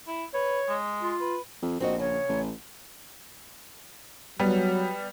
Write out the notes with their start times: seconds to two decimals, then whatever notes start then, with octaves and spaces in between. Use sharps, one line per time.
0.07 E4
0.34 B4 C#5
0.68 G#3
1.03 F4
1.20 B4
1.62 F2
1.80 A#1 C4 F#4 D#5
1.99 C#3 C#5
2.29 A1
4.40 F#3 G3 B3